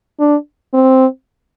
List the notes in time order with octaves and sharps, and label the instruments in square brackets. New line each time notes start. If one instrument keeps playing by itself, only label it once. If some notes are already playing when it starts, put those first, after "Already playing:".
[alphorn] D4
C4